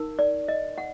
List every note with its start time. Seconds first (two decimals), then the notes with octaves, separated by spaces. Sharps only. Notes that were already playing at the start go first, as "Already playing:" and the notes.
Already playing: D#4 A#4
0.19 D5
0.48 D#5
0.78 F#5